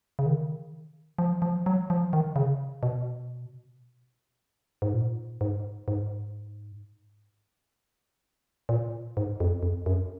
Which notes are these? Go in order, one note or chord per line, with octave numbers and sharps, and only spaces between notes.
C#3
D#3
F3
F3
F#3
F3
D#3
C#3
B2
G#2
A#2
G#2
G#2
A#2
G#2
F2
F2
F#2